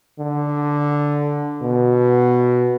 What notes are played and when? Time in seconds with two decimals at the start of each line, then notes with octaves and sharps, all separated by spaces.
0.19 D3
1.62 B2